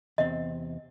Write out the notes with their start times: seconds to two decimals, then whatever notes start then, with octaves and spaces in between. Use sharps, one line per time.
0.18 E2 C3 C4 D#5